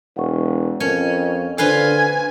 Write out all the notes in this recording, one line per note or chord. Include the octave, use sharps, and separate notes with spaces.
E1 F#5 C#6
F2 C#4 A#4 A5 G#6
D3 D4 F4 B4 C5 F5 G#5